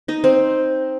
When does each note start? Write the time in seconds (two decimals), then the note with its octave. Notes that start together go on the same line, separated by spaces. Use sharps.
0.08 D#4 D#5
0.24 C4 C5